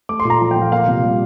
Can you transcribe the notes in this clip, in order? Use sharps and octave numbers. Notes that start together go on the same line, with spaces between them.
A3 D6
C6
A#2
A#5
F3
G5
A#2
F5
A#3 F5
C3
G3